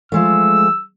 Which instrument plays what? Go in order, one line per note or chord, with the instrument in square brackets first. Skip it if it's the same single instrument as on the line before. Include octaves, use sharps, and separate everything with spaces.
[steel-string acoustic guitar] F3 G#3 A3 [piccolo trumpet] E6